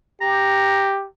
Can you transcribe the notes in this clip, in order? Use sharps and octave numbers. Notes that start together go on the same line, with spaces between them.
G4 A#5